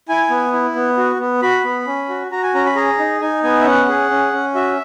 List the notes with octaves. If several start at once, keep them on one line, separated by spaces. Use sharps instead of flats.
E4 G#5
B3
E4
B3
F#4
B3
F#4 B5
B3
C#4
F#4
F#4 A#5
G#5
C#4 A#5
B5
G#4 A#5
D#4
D#4 G#5
B3 G#5
E5
C#4 F#5
G#4
C#4
C#4
F#4 E5